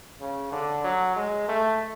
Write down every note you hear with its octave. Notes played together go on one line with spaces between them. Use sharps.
C#3
D3
F#3
G#3
A3